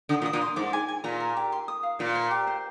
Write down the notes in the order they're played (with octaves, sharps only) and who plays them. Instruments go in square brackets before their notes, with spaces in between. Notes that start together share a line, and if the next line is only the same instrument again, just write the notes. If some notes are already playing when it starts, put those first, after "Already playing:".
[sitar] D3 [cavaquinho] D#6
[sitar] A#2
[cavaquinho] D#6
[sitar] A#2
[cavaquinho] C6
[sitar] G#2 [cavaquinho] D6
[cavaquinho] G#5
G#5
[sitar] A#2 [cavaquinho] A#5
[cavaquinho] A#4
G4
C6
D#6
F5
[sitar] A#2 [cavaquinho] C5
[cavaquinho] C5
G4
C5